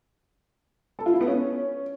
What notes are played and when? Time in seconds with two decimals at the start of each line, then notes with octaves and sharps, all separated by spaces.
0.99 A4
1.06 F4
1.13 E4
1.21 B3
1.28 C#4